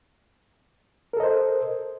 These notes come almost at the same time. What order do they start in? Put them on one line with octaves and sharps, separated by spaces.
A#4 A4 D#5 C5